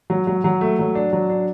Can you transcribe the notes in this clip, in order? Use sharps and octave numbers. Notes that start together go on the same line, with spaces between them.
F#3
F#3
F#3
A3
F#3
D4
F#3
D4